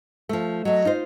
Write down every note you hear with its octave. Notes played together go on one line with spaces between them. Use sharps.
F3 A3
F#3 A3 D#5
D#4 F4 C5